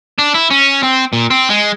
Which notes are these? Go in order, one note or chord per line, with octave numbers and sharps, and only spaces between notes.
D4
E4
C#4
C4
A#2
C4
G#3